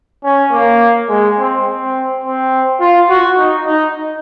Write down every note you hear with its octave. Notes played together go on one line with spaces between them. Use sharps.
C#4
A#3
G#3
C4
C4
C4
F4
F#4
D#4
D#4